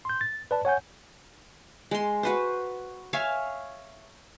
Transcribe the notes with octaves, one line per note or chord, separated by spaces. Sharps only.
C6 G6
A6
B4 D5 A5
C#5 F#5 G#5 G6
G#3 C6
F#4 B4 C5
C#5 E5 F5 G#5